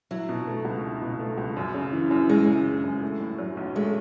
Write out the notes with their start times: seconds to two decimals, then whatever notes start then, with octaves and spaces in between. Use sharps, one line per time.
0.11 F#3 E4
0.29 B2
0.47 A3
0.65 C#2
0.83 E4
1.02 B2
1.19 A3
1.37 C#2
1.57 F#2
1.74 C#3
1.93 E3
2.11 F#2
2.29 F#2 G#3
2.47 C#3
2.66 E3
2.84 F#2
3.03 A3
3.20 A2
3.39 F#3
3.57 B1
3.75 G#3 A3